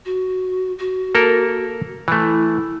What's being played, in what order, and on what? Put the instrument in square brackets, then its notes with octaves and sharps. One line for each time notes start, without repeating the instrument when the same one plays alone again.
[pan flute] F#4
F#4
[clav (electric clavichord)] A#3 A4 A#4
[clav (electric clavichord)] E3 A3 [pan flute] E4